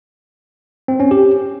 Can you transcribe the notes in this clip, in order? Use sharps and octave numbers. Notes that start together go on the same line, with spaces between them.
C4
C#4
G4